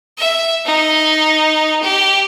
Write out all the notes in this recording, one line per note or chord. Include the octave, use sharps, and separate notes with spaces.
E5
D#4
G4